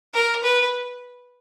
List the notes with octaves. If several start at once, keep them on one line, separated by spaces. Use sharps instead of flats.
A#4
B4